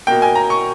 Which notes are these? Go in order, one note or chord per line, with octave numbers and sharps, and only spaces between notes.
B2 A#3 G5
G#5
A#5
C#6